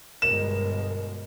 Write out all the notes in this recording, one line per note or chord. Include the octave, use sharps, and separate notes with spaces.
G1 B2 G#3 A#4 E7